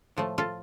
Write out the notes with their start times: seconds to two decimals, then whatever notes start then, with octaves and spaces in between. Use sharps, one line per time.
0.17 A2 F3 A3
0.38 F4 A4